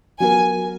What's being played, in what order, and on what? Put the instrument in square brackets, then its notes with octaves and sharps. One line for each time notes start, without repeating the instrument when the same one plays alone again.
[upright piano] F#3 B3 F#4 A#4 [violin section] G#5